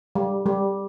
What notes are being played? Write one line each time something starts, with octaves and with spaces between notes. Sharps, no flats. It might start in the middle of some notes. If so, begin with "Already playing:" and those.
G3
G3